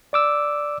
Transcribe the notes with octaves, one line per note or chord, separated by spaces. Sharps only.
D5 D6 E6